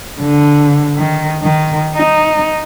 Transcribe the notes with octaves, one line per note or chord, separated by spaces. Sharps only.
D3
D#3
D#3
D#4